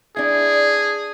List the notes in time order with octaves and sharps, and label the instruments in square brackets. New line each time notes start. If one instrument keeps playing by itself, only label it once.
[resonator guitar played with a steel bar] D4 E4 [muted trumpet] G#4